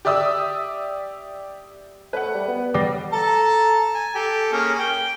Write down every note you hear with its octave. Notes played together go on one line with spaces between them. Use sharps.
G4 D5 E5 D#6 E6
A3 B4 F#5
G3
B3
G3 D6 A#6 C7
A4 A5 A#5
G#5
G4 A4
A#3 C#4 G#4
G5